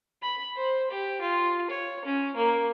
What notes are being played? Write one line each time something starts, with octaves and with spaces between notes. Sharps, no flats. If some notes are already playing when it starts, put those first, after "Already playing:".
B5
C5
G4
F4
C#5
C#4
A#3